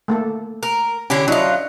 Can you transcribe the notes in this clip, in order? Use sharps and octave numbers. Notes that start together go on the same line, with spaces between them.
A3 A#3 A4
A#4
D3 C#4 E4 G4
F#3 D4 E4 F4 D#5